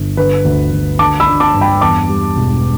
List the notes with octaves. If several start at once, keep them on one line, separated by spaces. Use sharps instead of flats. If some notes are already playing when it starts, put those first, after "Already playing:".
Already playing: G1
D3 B4
D2
D2
D3 A5 D6
B5 E6
D4
A5 D6
G2
G5 B5
E2 A5 D6
G3
E1